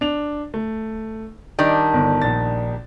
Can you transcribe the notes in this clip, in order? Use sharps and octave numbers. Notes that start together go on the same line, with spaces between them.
D4 F7
A3
D#3 G3 D4 D5
G1
A#1 A6